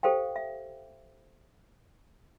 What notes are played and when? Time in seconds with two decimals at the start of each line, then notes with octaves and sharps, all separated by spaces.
0.03 G4 A4 C5 F5 G5
0.36 E5